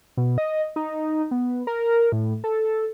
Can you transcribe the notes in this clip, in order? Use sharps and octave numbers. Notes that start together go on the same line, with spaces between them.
B2
D#5
D#4
B3
A#4
A2
A4